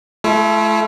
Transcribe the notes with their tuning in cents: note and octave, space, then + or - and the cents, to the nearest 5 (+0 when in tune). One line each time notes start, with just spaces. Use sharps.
A3 -30 E4 +35